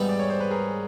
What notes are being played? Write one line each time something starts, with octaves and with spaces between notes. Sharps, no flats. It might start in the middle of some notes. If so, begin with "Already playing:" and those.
Already playing: G#2 E3 G3 B3 D#4
D5
C#5
C5
B4
G#4 A#4